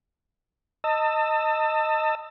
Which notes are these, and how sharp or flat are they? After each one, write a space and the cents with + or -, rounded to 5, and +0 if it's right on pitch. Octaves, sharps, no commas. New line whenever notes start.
D#5 +0 A5 +35 E6 +0